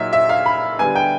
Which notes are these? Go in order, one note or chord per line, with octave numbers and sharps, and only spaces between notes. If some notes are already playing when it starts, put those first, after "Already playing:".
Already playing: A#2 F#3 D#4 E5
E5
F5
B5
D3 G3 B3 G#5
G5